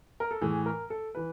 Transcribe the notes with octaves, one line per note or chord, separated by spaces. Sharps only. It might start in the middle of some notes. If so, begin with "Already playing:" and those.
A#4
A4
A2 E3 G#4
A#4
A4
E3 B4